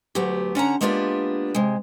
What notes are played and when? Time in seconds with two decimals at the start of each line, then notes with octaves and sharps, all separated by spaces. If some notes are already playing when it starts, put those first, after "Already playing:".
0.15 D2 F#3 A3 B3 G4
0.55 D3 C#4 F#5 A#5
0.81 G#3 A#3 B3 D4 F4 G4
1.55 C3 G#3